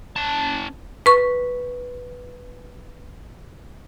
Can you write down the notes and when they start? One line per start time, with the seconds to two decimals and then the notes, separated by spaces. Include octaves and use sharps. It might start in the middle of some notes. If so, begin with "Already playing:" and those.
0.16 C#4 A5
1.06 B4 C#6